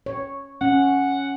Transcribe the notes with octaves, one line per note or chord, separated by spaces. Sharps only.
C#5
C#4 F#5